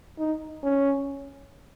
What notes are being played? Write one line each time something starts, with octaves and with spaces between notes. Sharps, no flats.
D#4
C#4